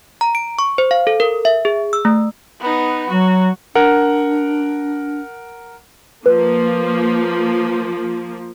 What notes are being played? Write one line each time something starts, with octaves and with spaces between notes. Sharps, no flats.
A#5
D7
C#6
C5
F5
A4
A#4
E5
G#4
E6
A3
B3 D#4
F#3 F#4
D4 A#4 F#5
F3 A#3 B4